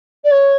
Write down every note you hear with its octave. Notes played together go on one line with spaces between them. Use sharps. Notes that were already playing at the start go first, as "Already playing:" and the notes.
D5
C#5